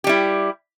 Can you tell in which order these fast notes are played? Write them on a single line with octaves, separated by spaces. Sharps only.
G4 G3 E4